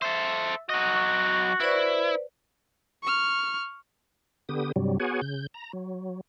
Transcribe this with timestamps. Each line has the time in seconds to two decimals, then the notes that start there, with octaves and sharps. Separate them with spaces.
0.02 A4 C5 E5
0.69 F#3 F#4 D#5
1.60 E4 B4 C5 D5
3.03 C#6 F6
4.49 D3 B3 G4 D#6
4.76 G2 C3 F#3 G3
5.00 B3 F#4 G#4 C#5 F#5 G#5
5.22 C#3 G6
5.54 A#5
5.73 F#3